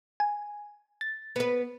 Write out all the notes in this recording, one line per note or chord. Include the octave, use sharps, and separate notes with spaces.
G#5
A6
B3 B4